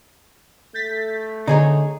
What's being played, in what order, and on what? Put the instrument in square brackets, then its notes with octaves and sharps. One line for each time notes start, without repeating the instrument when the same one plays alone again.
[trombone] A3 [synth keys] G6 A6 B6
[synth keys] D3 [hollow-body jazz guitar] D#4 G#4 C#5